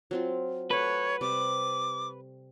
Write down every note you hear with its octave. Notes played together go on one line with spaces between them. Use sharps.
F#3 C4 F4
A3 B4 C#5 F#5
C3 G3 D6